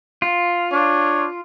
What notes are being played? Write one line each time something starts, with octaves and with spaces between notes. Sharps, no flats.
F4
D4 C#5